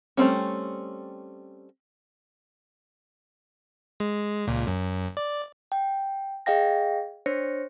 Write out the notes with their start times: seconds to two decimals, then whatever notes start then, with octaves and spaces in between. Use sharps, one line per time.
0.17 G3 A3 C4 C#4
4.00 G#3
4.47 C#2 A#2
4.67 F#2
5.17 D5
5.72 G5
6.46 G#4 D#5 F5 G5 A#6
7.26 D4 C5 C#5 A#6 C#7